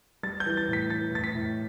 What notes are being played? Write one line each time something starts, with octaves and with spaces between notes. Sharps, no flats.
G3 A6
G6
E3
A6
A2
B6
E3 A6
A2 A6
B6
A2